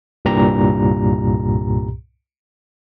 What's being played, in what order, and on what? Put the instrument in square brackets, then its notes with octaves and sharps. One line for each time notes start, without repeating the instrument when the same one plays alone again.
[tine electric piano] C2 G2 A#2 G4 A#5